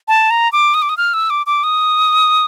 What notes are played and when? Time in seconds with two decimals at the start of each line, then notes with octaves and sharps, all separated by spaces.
0.08 A5
0.30 A#5
0.52 D6
0.74 D#6
0.82 D6
0.89 D#6
0.97 F6
1.14 E6
1.30 D6
1.46 D6
1.63 D#6